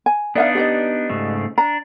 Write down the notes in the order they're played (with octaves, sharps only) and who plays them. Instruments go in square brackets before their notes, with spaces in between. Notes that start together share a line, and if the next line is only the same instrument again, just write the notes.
[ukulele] G#5
[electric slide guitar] B3 D4 D#4 [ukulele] D5 E5 F5
[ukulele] G4 D5 D#5
[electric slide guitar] G#2 C#3 A3
[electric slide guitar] D4 [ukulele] A#5